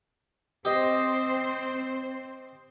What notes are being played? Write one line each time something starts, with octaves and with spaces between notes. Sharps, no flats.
C4 G4 C5 D#5